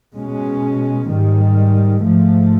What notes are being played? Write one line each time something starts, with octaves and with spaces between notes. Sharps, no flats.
B2 G#3 C#4
G#2 D#3 G3
G#2 F3 A3